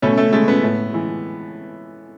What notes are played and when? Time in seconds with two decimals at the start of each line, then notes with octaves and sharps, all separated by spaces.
0.02 B2 A3 C#4
0.17 A3
0.32 G#3 A3
0.48 B3
0.63 A2
0.92 E3 G#3